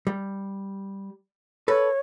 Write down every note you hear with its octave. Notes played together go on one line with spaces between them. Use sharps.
G3
A4 B4 C#5